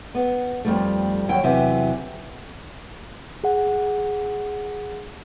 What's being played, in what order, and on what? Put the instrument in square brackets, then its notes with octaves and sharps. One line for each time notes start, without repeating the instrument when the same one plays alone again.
[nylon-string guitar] B3
F2 G3 A3
D#2 F#3 G5
E2 C3 E3 F#3
[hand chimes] G#4 F#5